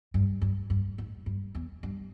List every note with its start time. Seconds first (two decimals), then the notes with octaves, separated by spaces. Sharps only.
0.14 G2
0.42 G2
0.70 G2
0.98 G#2
1.26 G2
1.55 E2
1.83 G2